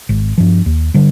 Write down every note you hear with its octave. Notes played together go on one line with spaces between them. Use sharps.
G#1
G2 F3
D#2
D3 G3